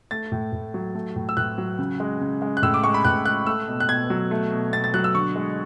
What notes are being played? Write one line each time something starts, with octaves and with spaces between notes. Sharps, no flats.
A3 A6
A2
A2
F#3
A3
A2
E6
A2 F#6
F#3
C#3
G#3
C#3
G#3
F#6
A2 E6
D6
G#3 C#6
B5
A2 F#6
G#3 F#6
A3 E6
B2
F#6
B2 G#6
F#3
A3
B2
B2 A6
A6
F#3 F#6
E6
D3 C#6
G#3